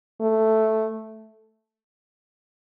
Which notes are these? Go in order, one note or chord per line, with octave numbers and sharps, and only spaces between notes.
A3